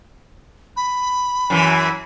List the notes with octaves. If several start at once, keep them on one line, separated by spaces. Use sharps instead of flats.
B5
F#2 E3